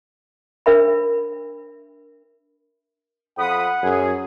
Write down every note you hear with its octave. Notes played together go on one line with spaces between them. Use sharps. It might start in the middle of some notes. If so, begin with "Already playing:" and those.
D4 A#4 E5 B5
F2 F#5 B5 D#6
F#2 G#4